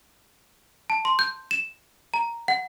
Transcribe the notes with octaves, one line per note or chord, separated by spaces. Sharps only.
A5
C6
G6
E7
A#5
F#5